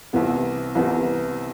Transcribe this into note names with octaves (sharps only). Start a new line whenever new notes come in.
C2 C3 E3 B3
C2 C3 E3 B3